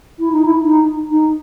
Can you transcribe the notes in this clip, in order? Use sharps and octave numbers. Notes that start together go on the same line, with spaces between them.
E4
D#4
E4
D#4
D#4